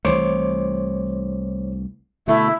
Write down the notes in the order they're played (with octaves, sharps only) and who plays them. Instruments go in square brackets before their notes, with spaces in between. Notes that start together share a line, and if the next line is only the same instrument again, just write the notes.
[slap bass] C2 E3 A3 [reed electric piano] C5 C#5 D6
[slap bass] B2 D3 [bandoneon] A3 [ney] E4